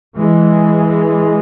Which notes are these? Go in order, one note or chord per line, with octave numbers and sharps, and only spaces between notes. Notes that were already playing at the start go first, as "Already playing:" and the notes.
E3 G#3